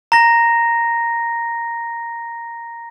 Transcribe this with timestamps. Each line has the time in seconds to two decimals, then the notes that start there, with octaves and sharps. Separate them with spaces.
0.12 A#5 A#6